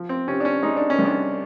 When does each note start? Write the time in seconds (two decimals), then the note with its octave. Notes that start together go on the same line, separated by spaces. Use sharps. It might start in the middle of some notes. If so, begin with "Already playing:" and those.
Already playing: F3
0.09 C4
0.28 C3 C#4
0.40 D4
0.45 C#4
0.63 G#3 D#4
0.77 D4
0.90 C#4
0.99 C2
1.05 D4